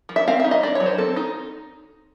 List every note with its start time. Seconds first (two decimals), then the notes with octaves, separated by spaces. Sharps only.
0.09 F3
0.16 E5
0.28 C4 F5
0.40 D#4 E5
0.51 D#5
0.63 D4 D5
0.75 F#3 C#5
0.86 C5
0.98 C4 A4
1.16 D#4